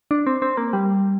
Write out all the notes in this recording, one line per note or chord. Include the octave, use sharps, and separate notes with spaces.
D4
C4
C4
A#3
G3